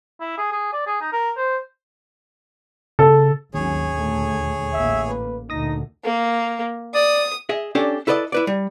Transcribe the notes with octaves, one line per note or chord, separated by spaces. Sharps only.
E4
G#4
G#4
D5
G#4
D#4
A#4
C5
C#3 A4
G#1 D#2 F#3 C#4 G#4 C#5
D2 A#2 A3
A1 A#3 E5
B4
D2 A#2 D#4 D#6 A#6
A#3
D5 D#6
G#4 D#5 E5
C#4 D4 G4 A4 D5
E4 A4 B4 D5 D#5
E4 B4 D5
G3